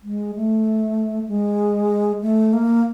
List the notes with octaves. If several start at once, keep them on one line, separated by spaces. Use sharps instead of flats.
G#3
A3
G#3
A3
A#3